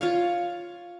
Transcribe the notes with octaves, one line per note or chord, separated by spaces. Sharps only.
F4 C#5 F5